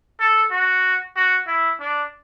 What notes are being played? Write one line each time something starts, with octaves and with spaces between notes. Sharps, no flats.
A4
F#4
F#4
E4
D4